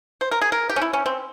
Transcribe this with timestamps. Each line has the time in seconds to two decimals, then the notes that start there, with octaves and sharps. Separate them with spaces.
0.21 C5
0.31 A#4
0.41 G#4
0.52 A#4
0.69 G4
0.76 C#4
0.81 E4
0.93 C#4
1.06 C4